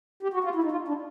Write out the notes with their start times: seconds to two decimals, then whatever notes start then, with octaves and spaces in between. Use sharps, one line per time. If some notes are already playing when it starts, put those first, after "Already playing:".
0.23 G4
0.34 F#4
0.44 F4
0.55 E4
0.64 D#4
0.71 F4
0.88 D4